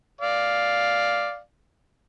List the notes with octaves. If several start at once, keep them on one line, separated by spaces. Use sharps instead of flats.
D5 F5